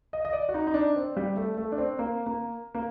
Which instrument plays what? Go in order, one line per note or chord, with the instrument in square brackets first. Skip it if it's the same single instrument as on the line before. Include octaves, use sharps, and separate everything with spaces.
[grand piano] D#5
D#5
D5
F#4
D#4
D#4
D4
C4
G3
A3
A3
D4
C4
A#3
A#3
A#3